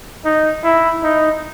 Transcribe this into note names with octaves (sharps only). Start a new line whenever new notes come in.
D#4
E4
D#4